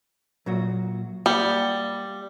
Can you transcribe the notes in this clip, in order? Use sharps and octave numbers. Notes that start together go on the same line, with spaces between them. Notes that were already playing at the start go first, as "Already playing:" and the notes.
A#2 F#3 F#4
G3 A#3 F#5